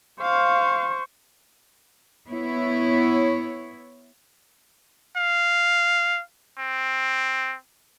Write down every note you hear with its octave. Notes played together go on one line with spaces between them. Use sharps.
C5 F5 C#6
B3 E4 C#5
F5
C4